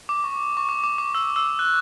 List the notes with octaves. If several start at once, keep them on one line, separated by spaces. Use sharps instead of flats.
D6
C#6
C#6
D6
D6
D6
E6
E6
F#6